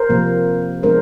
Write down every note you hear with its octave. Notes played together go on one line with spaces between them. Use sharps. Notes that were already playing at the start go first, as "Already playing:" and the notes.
Already playing: A#4 C5
C3 F3 A#3
F3 G#3 B3 D4 A#4 C5